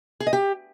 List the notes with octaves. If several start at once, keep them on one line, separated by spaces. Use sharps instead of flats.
G#4
D#5
G4